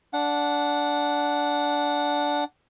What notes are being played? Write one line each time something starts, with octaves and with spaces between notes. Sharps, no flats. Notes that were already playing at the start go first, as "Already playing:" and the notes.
D4 F#5